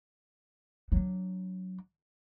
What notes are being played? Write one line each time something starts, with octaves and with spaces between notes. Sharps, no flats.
F#3 D4